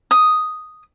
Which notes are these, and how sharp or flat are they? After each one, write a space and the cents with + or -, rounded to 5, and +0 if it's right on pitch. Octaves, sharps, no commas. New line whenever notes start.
D#6 +0